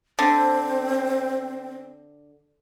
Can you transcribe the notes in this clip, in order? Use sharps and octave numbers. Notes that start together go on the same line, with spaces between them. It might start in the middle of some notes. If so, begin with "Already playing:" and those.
D3 C4